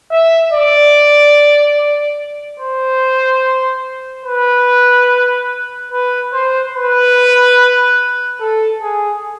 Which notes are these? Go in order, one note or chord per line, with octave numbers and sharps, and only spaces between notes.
E5
D5
C5
B4
B4
C5
B4
A4
G#4